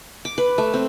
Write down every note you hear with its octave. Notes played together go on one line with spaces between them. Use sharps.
D6
B4
A3
C4